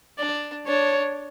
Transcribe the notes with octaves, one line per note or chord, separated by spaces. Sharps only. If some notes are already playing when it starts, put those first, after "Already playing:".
D4 D5
D4 C#5